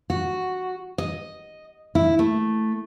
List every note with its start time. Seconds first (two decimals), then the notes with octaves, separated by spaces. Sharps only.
0.10 F#4
0.98 D#5
1.95 E4
2.19 A3